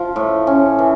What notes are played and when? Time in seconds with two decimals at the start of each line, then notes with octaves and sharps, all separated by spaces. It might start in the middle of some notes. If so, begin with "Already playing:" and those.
Already playing: F3 F4
0.16 A2
0.47 C#4
0.79 E3